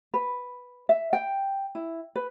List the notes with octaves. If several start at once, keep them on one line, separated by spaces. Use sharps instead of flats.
B4
E5
G5
E4
B4